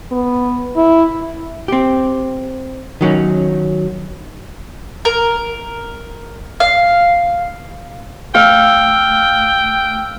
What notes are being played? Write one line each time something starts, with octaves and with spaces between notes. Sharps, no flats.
B3
E4
C4 G4
D#3 F#3 C#4 D#4
A#4
F5
A3 F5 G5 E6